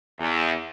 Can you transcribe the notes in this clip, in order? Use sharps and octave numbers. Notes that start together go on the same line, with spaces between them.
E2